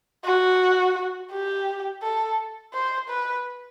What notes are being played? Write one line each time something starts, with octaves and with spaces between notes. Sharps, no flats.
F#4
G4
A4
C5
B4